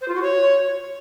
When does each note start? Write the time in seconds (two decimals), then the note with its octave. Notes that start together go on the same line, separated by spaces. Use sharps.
0.01 C5
0.08 F4
0.15 F#4
0.22 C#5